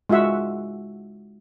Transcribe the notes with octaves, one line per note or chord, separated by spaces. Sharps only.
G#3 F4 F#4 E5 F#5